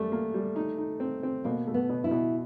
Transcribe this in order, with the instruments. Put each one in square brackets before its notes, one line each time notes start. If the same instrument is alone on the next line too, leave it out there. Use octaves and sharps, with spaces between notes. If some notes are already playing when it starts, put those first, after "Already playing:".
Already playing: [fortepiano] F#2 G3 [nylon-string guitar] A3
[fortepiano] A#3
G3
D#4
D#4
C4
C4
[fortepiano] B2 [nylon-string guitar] A#3
[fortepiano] A3
[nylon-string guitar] B3
[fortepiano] B2
[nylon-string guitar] E4
[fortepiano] B2